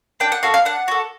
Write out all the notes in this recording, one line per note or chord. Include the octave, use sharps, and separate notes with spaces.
D4 G5
F#5
F#4 A4 F5
F5
D4 F#5
F#4 A4